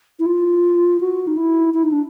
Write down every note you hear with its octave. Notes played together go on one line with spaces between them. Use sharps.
E4
F4
F#4
D#4
E4
E4
D#4
D4